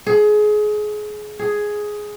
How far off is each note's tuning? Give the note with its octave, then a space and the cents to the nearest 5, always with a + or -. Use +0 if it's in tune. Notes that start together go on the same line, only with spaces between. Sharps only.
G#4 +25
G#4 +5